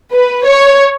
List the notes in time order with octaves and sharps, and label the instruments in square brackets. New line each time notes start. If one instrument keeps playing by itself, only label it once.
[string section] B4
C#5